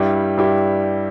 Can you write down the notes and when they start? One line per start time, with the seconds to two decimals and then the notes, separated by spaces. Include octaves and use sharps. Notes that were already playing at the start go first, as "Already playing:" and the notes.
Already playing: G2 G3 E4 G4
0.37 G2 G3 E4 G4